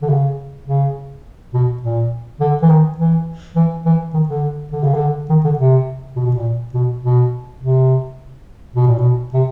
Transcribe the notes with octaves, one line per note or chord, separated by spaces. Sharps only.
D3
C#3
C#3
B2
A#2
D3
E3
D#3
E3
E3
E3
D#3
D3
D3
C#3
D3
D#3
D3
C3
B2
B2
A#2
B2
B2
C3
B2
A#2
B2
C3